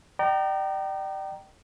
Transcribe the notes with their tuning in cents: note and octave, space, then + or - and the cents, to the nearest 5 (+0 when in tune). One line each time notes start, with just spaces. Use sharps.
D5 +45 G5 -30 A#5 +0